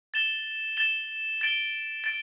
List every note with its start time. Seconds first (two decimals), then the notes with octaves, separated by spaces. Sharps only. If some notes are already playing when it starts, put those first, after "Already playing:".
0.14 A6 E7 G7
0.77 A6 E7 G7
1.41 A6 D7 G7
2.04 A6 D7